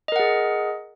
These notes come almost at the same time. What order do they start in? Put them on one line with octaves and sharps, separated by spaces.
D#5 A#4 F#5 G#4